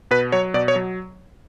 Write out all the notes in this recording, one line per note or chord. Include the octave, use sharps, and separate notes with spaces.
B2 B4
F#3 C#5
B2 D5
C#5
F#3